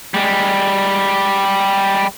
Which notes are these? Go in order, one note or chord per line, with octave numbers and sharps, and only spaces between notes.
G3 G#3